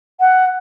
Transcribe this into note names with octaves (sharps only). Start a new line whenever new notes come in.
F#5